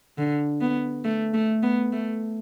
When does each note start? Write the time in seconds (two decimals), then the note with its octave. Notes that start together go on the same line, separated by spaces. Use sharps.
0.18 D3
0.61 B3
1.04 A3
1.34 A3
1.63 B3
1.93 A3